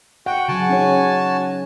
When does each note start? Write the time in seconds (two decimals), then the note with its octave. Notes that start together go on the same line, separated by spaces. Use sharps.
0.26 F#4 F#5 G5
0.48 C#3 F#3 F#4 G#5 A5
0.69 C#4 D#4 C#5